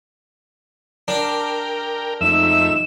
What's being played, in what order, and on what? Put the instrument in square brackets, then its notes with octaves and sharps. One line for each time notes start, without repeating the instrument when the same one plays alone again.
[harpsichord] D4 [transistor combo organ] A#4 G5
[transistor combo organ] F2 E5 [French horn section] G#3 A3 D#4 [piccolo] E7